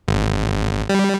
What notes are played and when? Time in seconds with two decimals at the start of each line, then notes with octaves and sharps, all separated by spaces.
0.08 G#1
0.89 G3